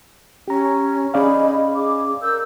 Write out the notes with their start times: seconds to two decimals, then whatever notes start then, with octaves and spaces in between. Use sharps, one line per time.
0.48 C#4 G4 A#5
1.14 C#4 G#4 D5 D#5 F5 B5
1.76 G#4 D6
2.22 A#4 E6 G6